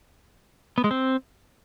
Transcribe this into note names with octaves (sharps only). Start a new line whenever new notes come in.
B3
G#3
C4